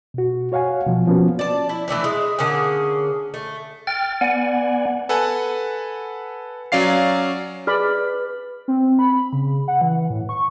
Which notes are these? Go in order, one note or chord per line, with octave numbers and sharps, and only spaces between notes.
B2 F#4
F#4 C#5 F5 F#5 G#5
B2 F3
F3 A#3 B3 C#4 F#4
D5 A5
E4
E3 A3 D4 E4
G#3
D3 A#3 C#4 G#4
A3
G5 F6 A6
B3 D5 F#5 G#5
A4 B4 F#5 G#5
F#3 C#4 D5 F5 C7
G#4 B4 D5 B5 F6
C4
B5
C#3
F#5
E3
A2
C#6